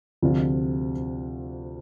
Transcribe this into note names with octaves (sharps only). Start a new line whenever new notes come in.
D2 C3 F3 C4 F4